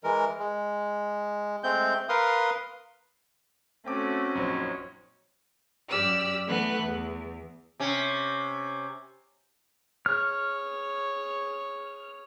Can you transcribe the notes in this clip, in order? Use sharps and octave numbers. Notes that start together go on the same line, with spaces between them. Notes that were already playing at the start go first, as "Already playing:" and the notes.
E3 G#3 A#4
G#3
G#3 A3 C4 G6
A#4 B4 F5 C6 D#6
A3 C4 C#4 F#4 G5 D6
A#1 F#2 D#4 C5 C#5
F#2 G4 D5 E6 F6
E3 A3 B3 F#6
E2
C3 C#4
G#4 C#5 F6